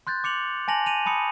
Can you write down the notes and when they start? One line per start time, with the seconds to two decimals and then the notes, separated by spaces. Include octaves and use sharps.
0.07 C6 F#6 G6 A6
0.24 D6 C#7 F7 F#7
0.68 G#5 A5 A#6 F7 F#7
0.86 D#7 F7
1.06 A5 B5 D#6 C#7